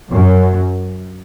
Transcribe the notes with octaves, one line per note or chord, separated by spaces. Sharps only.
F#2